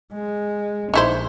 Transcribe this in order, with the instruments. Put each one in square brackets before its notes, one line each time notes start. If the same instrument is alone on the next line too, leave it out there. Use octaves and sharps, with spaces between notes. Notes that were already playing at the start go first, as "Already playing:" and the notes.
[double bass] G#3
[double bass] A#1 [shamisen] D#4 E4 C5